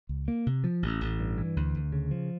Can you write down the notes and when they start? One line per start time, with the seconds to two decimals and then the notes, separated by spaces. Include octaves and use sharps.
0.09 C#2
0.28 A#3
0.46 C3
0.64 F3
0.82 A1
1.01 A1
1.20 G2
1.38 E3
1.56 D2
1.75 D2
1.92 C#3
2.11 F3